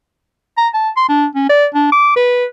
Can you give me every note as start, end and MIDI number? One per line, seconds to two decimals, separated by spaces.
0.58 0.68 82
0.74 0.90 81
0.97 1.06 84
1.09 1.26 62
1.35 1.45 61
1.49 1.66 74
1.74 1.89 62
1.92 2.12 86
2.16 2.45 71